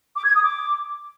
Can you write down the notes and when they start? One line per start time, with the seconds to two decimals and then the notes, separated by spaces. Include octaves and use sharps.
0.16 D6
0.25 G#6
0.34 D#6
0.43 D6